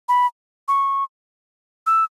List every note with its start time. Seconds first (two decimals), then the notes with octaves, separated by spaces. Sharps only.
0.09 B5
0.68 C#6
1.87 E6